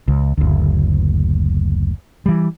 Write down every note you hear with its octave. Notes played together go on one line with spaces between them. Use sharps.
C#2
F#1 D2
E3 G3